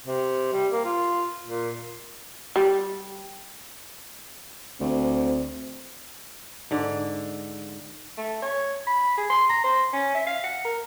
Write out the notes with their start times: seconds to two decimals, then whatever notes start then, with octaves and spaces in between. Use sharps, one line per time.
0.06 C3
0.53 G3
0.72 A#3
0.84 F4
1.46 A#2
2.56 G3
4.80 D2 C4
6.71 G#2 D3
8.17 A3
8.42 C#5
8.87 B5
9.17 G#4
9.30 C6
9.49 A#5
9.64 C5
9.93 C#4
10.15 E5
10.27 F5
10.44 F#5
10.65 A#4